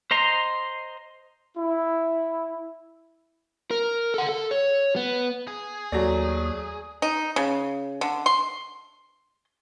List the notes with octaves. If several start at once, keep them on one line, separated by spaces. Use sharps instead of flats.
C5 D#5 A#5 C6
E4
A#4
A4 F#5
A4
C#5
B3
G#4
D#2 F#3 A3 D5
D#4
C#3
D3
C6